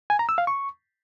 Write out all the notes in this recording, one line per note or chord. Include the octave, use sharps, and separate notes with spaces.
G#5
A#5
E6
F5
C#6